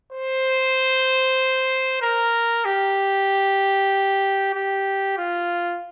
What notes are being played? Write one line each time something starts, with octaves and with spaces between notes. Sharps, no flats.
C5
A#4
G4
G4
F4